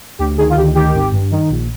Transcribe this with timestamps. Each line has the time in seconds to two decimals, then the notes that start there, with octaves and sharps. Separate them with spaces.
0.19 D2 G4
0.37 D#3 G#4
0.50 F4
0.56 D2 G4
0.75 D#3 G4
0.94 G#1
1.12 G2
1.31 D#3
1.50 A#1